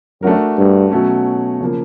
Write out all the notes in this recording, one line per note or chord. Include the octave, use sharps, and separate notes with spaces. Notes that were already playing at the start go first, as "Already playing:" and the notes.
F#2 A3 D4 F#4 A#4
G2
B2 F#3 A3 C#4
C#3 F3 A#3